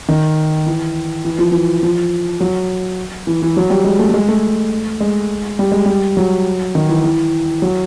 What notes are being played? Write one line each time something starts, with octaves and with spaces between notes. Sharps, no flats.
D#3
E3
E3
F3
E3
F3
F#3
E3
E3
F#3
G3
G#3
A3
A3
G#3
A3
G#3
G3
G#3
G3
F#3
D#3
E3
E3
F#3